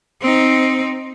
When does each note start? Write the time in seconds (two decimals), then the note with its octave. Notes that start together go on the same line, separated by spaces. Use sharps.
0.21 C4 D#4